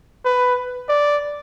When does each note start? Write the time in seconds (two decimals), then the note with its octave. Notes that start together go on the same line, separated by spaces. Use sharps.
0.25 B4
0.89 D5